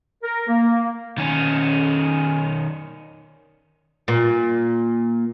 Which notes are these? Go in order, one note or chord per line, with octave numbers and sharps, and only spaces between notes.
A#4
A#3
D#3 C#4
A#2